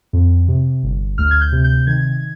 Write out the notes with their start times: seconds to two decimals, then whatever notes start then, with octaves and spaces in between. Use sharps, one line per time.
0.13 F2
0.48 C3
0.83 G1
1.18 D2 F6
1.31 G#6
1.41 G6
1.52 C3
1.64 G6
1.87 D#3 G#6